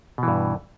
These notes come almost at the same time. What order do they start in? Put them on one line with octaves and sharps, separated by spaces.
B2 E3 G2